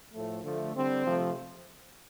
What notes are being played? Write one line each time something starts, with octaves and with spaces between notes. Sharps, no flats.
A2 F3 A3
D3 F3 A3
D3 G3 C4
C3 F3 A3